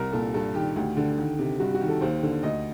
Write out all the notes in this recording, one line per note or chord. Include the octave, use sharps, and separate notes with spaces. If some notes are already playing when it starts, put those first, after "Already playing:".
Already playing: C2 C3 A#4
A#2 A4
G2 A4
D#3 G4
D2
D3
D#3
C3
G2 F#4
F#4
D#3
A4
D#2 C5
D3
D2 D#5